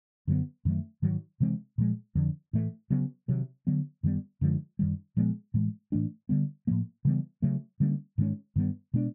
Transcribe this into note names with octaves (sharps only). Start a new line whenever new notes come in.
F#2 D3 F#3 B3
F#2 D#3 F#3 A3
G#2 D#3 F#3
C3 E3 G#3 C4
A#2 F3 G#3
F2 D3 F3
A2 E3 A3
C#3 F#3 B3
C3 D#3 F#3
D3 F#3 B3
F#2 D#3 G3 B3
F#2 D3 F3 G#3
F#2 D#3 G3
A#2 F3 G#3 B3
A2 E3 G#3
A2 E3 A3 D4
D3 G3 B3
A2 F3 A#3
C#3 E3 G3 B3
C#3 F#3 A3
D3 G3 A#3 C#4
G#2 D#3 G#3 C#4
G2 D#3 G3 B3
B2 G#3 B3 D4